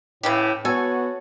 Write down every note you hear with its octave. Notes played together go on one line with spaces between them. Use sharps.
A2 C#3 E3 G4
B3 F#4 A4 C#5 G#5